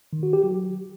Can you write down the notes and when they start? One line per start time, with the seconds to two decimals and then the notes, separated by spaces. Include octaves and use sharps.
0.13 D#3
0.23 F#4
0.33 G4
0.44 F#3